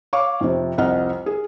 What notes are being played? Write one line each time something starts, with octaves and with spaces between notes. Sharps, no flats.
C#5 F5 C#6 D6
F2 C3
C2 F2 D#5 F#5 F6
G#4